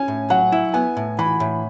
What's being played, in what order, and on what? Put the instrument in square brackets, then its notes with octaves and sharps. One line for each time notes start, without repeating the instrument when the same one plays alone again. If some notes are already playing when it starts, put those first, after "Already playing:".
Already playing: [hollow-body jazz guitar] C#4 [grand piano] G#5
[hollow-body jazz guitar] A2
[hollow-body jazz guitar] F#3 [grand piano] F#5
[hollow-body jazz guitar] E4
[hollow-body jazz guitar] B3 [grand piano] G#5
[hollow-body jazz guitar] A2
[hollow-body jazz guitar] E3 [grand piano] B5
[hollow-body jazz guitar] A2